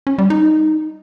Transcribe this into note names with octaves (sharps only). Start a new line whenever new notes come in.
C#4
G3
D#4